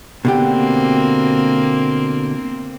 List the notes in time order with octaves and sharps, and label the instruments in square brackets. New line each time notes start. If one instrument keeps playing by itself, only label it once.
[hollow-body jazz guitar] B2 D3 G4 [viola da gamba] A#3 C4